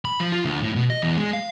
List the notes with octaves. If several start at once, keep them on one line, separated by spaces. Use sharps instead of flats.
B5
F3
F4
D2
A2
B2
D#5
E2
G#3
F5